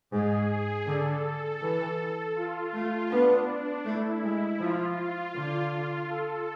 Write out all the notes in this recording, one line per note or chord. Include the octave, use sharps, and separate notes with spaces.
G#2 G#4
D3 A4
E3
F4
A3
B3 D4
A3 E4
G#3
F3 F4
D3
A4